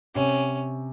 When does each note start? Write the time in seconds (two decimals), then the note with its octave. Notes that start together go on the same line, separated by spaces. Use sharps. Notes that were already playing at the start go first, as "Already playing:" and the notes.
0.15 C3 C#4